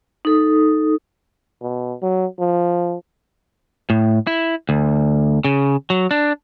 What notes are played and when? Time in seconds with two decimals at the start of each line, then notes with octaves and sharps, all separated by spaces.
0.25 D#4 A4 D#6
1.62 B2
2.02 F#3
2.39 F3
3.90 A2
4.27 E4
4.69 D2
5.45 C#3
5.90 F#3
6.11 D4